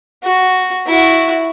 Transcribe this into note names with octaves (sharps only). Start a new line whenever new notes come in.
F#4
E4 F#4